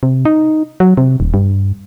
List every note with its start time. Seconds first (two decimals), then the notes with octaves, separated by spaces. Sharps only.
0.03 C3
0.25 D#4
0.80 F#3
0.97 C3
1.20 D#1
1.34 G2